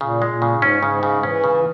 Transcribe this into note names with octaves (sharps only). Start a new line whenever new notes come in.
A#2 C#3
G#3
A#2
C#3
G#2
C#4
G#2 C#3
C#3
E3 C#4
C#3